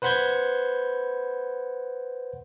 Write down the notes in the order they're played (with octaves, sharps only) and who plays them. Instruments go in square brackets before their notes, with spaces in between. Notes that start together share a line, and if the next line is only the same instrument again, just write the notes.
[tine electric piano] B4 C5 F#5 B5 G6 G#6